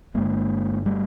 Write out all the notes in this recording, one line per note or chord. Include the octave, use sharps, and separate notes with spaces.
G1 G2 D3 G#3 A#3
G3 A3